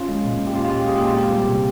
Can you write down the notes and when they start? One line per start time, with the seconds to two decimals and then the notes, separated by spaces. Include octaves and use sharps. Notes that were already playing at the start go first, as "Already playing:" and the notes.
Already playing: C#4 F4
0.08 G#3
0.24 A#2
0.39 A#2
0.47 G4
0.54 C#4 F4
0.65 F4
0.70 G#3
0.76 G4
0.85 A#2 G#4
0.96 G4
1.02 A#2
1.07 F4
1.17 C4 G4
1.32 G3
1.48 C3